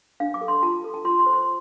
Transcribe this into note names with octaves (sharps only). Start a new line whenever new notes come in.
D4 F5
D6
A4
C6
F4 A5
A4
A5
F4 C6
C6
C5
C6